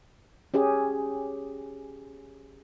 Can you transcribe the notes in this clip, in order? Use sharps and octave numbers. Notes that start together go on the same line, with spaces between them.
C#4 G4 G#4